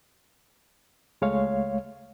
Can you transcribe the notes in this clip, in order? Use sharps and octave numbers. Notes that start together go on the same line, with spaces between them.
C#2 G#3 A3 C#5 F5